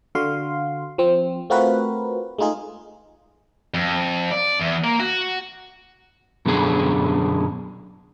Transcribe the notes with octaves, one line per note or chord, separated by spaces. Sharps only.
D3 F#4 F5 C6
F3 C4
A3 C4 F4 F#4 A#4 B4
G#3 A3 D#4 F4 G#4
F2
D5
E2
A#3
F#4
F#2 B2 D3 G#4